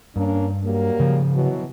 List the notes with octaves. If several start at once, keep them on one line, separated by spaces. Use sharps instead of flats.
G2 A#3 C#4 D4
F#3 G3 A#3
C#3 F3
B2 E3 F#3